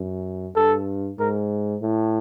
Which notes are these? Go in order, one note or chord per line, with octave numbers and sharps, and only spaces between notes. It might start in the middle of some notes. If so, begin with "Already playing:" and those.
Already playing: F#2
G2 A4
G#2 A#4
A2